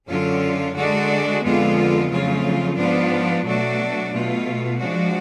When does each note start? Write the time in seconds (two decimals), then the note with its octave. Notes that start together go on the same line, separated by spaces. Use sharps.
0.08 F#2 D3 F#3 C#4 F4
0.76 D3 G#3 D4 F#4
1.43 F2 D3 G#3 B3 F4
2.10 F2 C#3 F#3 A3 F4
2.77 G#2 F3 B3 D4 F4
3.44 B2 F#3 A3 D4 F#4
4.12 B2 A3 F4
4.79 F3 G#3 D4 F#4